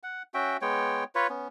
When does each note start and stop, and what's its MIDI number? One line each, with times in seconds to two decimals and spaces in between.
0.03 0.23 78
0.34 0.57 61
0.34 0.57 66
0.34 0.57 76
0.34 0.57 79
0.62 1.04 56
0.62 1.04 59
0.62 1.04 73
0.62 1.04 79
1.15 1.27 65
1.15 1.27 71
1.15 1.27 73
1.30 1.48 59
1.30 1.48 61